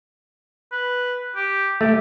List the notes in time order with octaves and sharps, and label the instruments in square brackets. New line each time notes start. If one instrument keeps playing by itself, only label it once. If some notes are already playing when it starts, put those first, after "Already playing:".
[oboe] B4
G4
[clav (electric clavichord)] A3 [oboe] G4